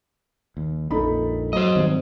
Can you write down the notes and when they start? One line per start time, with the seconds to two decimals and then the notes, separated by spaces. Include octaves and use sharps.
0.57 D#2
0.91 A#1 F2 A#2 D#4 A4 B5
1.53 F#3 C5 D#5
1.76 G#1 D#3 G3